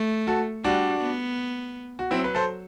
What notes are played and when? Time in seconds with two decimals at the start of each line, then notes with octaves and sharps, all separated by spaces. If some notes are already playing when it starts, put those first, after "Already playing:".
Already playing: A3
0.27 F#4 A4
0.64 G3 D4 F#4
1.00 B3
1.99 F#4
2.11 F#3 C4 E4
2.24 B4
2.35 A4 C5